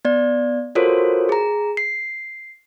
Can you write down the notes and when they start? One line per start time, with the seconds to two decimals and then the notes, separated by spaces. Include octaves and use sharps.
0.05 B3 D5
0.75 F4 F#4 A4 A#4 C5 C#5
1.29 G#4 A#5
1.77 C7